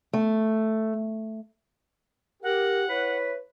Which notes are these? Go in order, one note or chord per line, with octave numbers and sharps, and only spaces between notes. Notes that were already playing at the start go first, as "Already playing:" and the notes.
A3
G4 A#4 F#5
E4 B4 C#5